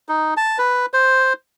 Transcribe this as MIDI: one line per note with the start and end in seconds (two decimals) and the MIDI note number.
0.09 0.34 63
0.37 0.58 81
0.58 0.86 71
0.93 1.33 72